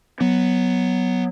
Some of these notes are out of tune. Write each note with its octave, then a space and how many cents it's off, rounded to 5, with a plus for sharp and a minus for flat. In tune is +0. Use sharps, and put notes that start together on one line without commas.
F#3 +0 B3 +0